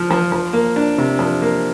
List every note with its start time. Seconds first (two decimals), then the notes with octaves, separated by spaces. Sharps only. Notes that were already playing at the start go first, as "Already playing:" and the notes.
Already playing: F3 F4
0.11 F3
0.32 F3
0.53 A#3
0.76 D4
0.98 C3
1.19 F3
1.42 A#3